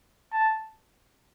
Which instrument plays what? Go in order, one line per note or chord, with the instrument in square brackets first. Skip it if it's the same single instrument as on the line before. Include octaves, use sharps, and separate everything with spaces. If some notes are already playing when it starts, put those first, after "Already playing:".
[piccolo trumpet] A5